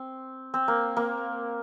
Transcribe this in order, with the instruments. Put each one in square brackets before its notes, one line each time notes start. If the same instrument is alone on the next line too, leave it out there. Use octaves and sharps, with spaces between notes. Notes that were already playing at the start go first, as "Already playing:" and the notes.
Already playing: [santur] C4
C4
A#3
A#3